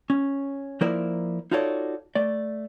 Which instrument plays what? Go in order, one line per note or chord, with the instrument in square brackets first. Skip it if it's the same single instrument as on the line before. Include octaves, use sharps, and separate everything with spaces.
[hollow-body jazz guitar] C#4
F3 A#3 E4 A#4 C5 D5
D#4 F4 F#4 A4 C#5 D5
A3 D5